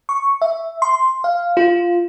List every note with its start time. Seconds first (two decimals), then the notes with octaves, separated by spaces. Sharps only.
0.09 C#6
0.42 E5
0.82 C6
1.24 F5
1.57 F4